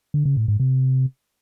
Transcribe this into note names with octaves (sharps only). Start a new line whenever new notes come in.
D3
C#3
A2
G#2
C3